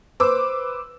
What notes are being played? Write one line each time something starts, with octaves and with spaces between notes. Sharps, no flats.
B4 C5 D6 E6